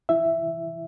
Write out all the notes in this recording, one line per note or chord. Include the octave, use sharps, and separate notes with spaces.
E4 E5